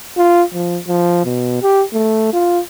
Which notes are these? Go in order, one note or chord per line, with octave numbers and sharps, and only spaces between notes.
F4
F3
F3
B2
G4
A3
F4